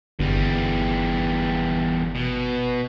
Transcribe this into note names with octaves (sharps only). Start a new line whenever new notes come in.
G1 E2 G3
B2